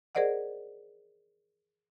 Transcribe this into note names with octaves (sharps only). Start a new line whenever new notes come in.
G#4 A#4 C5 D5 D#5 F#5